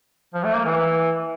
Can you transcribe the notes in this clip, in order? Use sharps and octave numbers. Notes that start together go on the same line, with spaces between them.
F3
A3
A#3
E3